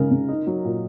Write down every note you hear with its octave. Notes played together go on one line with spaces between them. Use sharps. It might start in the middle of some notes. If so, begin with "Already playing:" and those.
Already playing: C#3 G#3 A#4
C#3
D#4
F#3
A#2